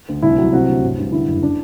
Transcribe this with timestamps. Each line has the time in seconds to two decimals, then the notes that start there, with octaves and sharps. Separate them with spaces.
0.09 D2
0.22 C2 E4
0.38 F#3
0.52 C3 F#4
0.69 D2
0.83 G1
0.98 G2
1.12 D3 E4
1.28 F#1
1.43 D4